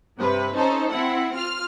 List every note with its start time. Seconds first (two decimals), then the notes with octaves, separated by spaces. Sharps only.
0.18 G2 C3 B4
0.54 C#4 D#4 A4 C5
0.91 C4 E4 F#5
1.35 F4 F6